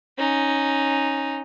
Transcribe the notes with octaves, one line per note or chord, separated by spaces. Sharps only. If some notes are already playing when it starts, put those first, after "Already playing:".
C#4 D#4